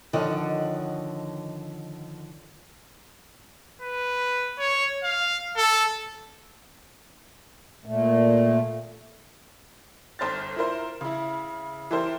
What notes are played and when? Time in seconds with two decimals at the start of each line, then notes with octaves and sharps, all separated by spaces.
0.13 D3 D#3 F3 C#5 D#5 F#5
3.82 B4
4.59 C#5
5.03 F5
5.57 A4
7.85 A#2 A3
10.19 G1 C5 F6 A6
10.56 E4 F4 A#4 C5
11.01 C#3 E4
11.91 E3 E4 G4 A4 A#4 C5